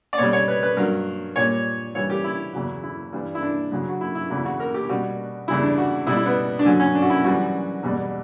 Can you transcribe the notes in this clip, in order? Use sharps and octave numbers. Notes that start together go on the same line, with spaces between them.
D5
B2 G3 C#5
C#5
B4
B4
G2 F#3 A#4
A#2 G3 C#5
G2 E3 G3 C#5
G4
E4
E2 C#3 F#3
E4
G2 E3 G3
E4
D4
F#2 C#3 F#3
F#4
E4
E4
E2 C#3 F#3 E4
F#4
A#4
G4
B2 G3 F#4
E2 C#3 G3 E4
D4
F#4
B2 G3 E4
E4
B3
D4
F#2 D3 F#3 C#4
C#4
D4
F#4
E4
F#2 E3 G3 F#4
E2 B2 G3